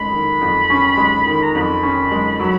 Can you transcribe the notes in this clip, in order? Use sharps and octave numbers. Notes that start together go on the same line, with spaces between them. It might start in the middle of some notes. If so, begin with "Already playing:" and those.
Already playing: F2 D#3 G#3 C#4 B5
D#3
F2
C#4
G#3
D#3
A#5
F2 B5
C#4
G#3
F#3